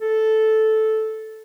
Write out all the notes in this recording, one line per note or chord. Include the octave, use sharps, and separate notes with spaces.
A4